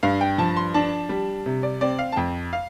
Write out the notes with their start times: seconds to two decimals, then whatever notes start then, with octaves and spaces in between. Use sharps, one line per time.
0.03 G2 F5
0.21 G5
0.38 F3 A5
0.57 C6
0.74 D4 A5
1.09 G3
1.46 C3
1.63 D5
1.81 C4 D5
1.99 F5
2.12 A5
2.16 F2 G5
2.53 F5